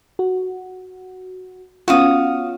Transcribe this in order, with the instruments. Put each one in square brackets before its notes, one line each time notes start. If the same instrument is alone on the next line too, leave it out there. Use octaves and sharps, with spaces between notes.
[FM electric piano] F#4
[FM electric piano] B3 C#4 F4 [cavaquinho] F#4 F5 D#6